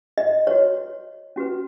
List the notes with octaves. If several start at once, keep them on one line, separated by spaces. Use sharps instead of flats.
D#5
F#4 B4 C#5
C#4 F#4 B4